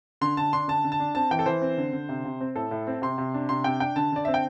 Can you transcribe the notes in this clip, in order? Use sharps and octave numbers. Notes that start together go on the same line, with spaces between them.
D3 C6
D3 A5
D4 C6
D3 A5
D3
A5
D4
C4 A5
E3 G5
A4
E3 C5
C4
D3
D3
C3
C3
C4
A2 A4
A2
C4
C3 C6
C3
D4
C3 C6
C3 G5
D4 G5
D3 A5
D3 D5
C4 E5
G5